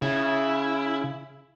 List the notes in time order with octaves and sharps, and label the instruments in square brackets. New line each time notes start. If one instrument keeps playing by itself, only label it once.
[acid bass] C#3 [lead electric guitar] E4